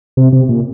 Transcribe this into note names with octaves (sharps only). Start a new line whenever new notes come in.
C3
C3
A#2